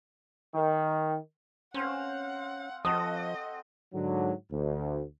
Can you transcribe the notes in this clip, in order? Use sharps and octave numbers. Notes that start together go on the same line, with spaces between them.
D#3
C4 C#4 C5 F5 F#5
F3 C4 F#4 A4 D#5 D#6
G#2 D3 F#3
D2